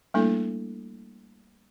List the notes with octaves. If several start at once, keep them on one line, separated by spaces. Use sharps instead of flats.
G3 A3 A#3 D4 E4 A4